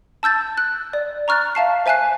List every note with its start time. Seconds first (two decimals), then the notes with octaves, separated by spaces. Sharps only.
0.23 A5 E6 G6 A6
0.57 F#6
0.93 D5
1.28 A#5 C#6 F6 F#6 A6
1.55 E5 F5 A5 C7
1.86 C5 E5 G#5 A5 F#6 C7